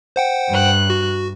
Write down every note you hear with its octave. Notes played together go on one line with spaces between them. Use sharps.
C5 F#5 G5
G2 F#6
F#4